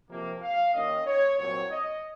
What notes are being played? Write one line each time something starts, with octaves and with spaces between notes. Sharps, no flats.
F2 C3 F3 A#3
F5
D#2 D#3 A#3 C#4 D#5
C#5
C2 A#2 F#3 C4 C#5
D#5